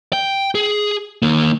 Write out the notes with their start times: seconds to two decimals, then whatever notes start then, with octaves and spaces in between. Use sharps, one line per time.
0.13 G5
0.55 G#4
1.22 D#3 A#3